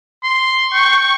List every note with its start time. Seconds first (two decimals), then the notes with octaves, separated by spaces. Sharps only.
0.23 C6
0.73 G5 C#6